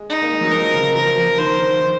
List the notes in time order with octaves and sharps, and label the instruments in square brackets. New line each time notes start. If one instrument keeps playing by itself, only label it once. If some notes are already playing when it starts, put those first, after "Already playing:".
Already playing: [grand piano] G#3
[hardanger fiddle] D#4
[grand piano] A#3
G#3
F#3
[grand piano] F3 [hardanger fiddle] A#4
[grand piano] C#3
[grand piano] F3 [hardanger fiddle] A#4
[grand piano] F3
[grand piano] D#3 [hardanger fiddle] C5
[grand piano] D#3
D#3